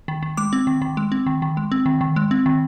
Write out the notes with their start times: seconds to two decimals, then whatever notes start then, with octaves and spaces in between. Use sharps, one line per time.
0.08 D#3
0.23 D#3
0.37 G#3 D6
0.53 C4
0.67 D#3
0.82 D#3
0.97 G#3
1.12 C4
1.26 D#3
1.42 D#3
1.57 G#3
1.72 C4
1.86 D#3
2.01 D#3
2.16 G#3
2.31 C4
2.46 D#3